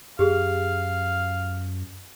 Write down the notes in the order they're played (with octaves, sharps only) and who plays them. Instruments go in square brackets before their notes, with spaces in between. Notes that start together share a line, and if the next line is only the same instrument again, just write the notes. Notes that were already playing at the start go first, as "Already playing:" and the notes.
[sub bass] F#2 [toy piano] G4 G#4 [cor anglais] F5